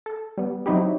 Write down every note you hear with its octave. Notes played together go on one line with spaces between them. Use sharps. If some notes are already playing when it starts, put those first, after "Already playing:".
A4
G3 B3
F#3 C4 D#4 E4 G4